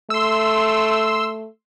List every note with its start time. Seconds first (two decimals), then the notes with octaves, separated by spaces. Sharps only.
0.10 A3 C6 E6